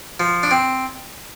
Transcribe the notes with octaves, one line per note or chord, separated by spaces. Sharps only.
F3
D4
C4